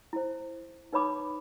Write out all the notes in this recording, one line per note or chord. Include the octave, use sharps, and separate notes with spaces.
E4 C5
D#4 B4 C#5 B5 D6 D#6